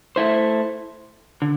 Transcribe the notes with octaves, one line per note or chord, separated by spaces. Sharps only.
A3 E4 C5
D3